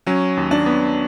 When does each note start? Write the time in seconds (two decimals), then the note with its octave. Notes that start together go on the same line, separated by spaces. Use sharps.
0.07 F#3 C#4
0.37 D#2
0.51 D4
0.66 B3